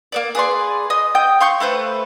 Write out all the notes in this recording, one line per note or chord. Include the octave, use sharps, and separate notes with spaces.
A#3 B3 D5
G#4 B4 D5 C6
D#5 D#6
G5 D#6 G6
F5 C6 C#6 G6
A3 B4 C5 G6